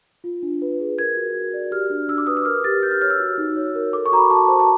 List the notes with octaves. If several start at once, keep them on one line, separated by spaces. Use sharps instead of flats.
F4
D4
B4
G#4
A#4 G#6
F#4
F#4
D5
G4 F6
D4
D4 E6
D6
B4 D#6
E6
A#4 F6
G4 A6
G4 G6
F6
C#5 F6
E6
F#4
D#4
C#5
A#4
A4 D6
C#6
F#4 A#5
B5
F#4 A5
C5
A5